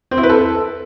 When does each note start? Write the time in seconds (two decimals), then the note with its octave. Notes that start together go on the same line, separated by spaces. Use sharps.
0.11 C4
0.17 E4
0.23 B4
0.29 A4